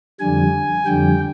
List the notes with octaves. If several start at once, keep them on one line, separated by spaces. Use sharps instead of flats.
F2 D3 G3 G#5
F2 D3 G3 G5